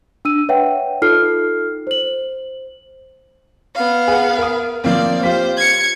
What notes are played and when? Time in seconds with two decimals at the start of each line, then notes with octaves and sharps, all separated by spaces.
0.25 D4 E6 D#7
0.49 B4 C#5 E5 F#5 G5
1.02 D#4 F4 A4 F6 C7
1.87 C5 F#7
3.75 B3 F5
4.08 G#4 B4 F#5
4.38 A#4 D#6
4.84 F3 A#3 C4 D5 F5
5.23 F4 G4 C5 B6
5.57 G#6 C#7